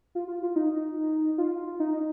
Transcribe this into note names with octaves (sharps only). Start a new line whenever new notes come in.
F4
F4
F4
D#4
F4
D#4